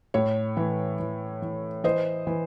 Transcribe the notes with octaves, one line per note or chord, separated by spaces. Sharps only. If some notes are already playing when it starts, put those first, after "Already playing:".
A2 C#5
E3
E3
E3
E3 C5 D#5
E3